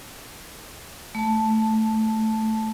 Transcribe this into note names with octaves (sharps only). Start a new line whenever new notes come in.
A3 A5